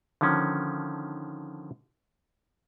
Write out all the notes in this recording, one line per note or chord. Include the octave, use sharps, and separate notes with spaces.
D3 D#3 F3 C#4